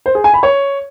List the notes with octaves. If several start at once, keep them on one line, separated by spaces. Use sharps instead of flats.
C5
G#4
G#5
B5
C#5